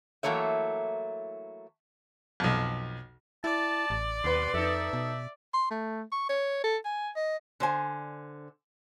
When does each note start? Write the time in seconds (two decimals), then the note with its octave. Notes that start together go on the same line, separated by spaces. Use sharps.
0.23 E3 F#3 A3 A#3 C#5 E5
2.40 B1 F2
3.44 E4 D5 A5
3.90 A1
4.24 D#2 B2 B4 C6
4.54 F2 D#4 A4 E5
4.93 B2
5.54 C6
5.71 A3
6.12 C#6
6.29 C#5
6.64 A4
6.85 G#5
7.16 D#5
7.60 D3 C5 G#5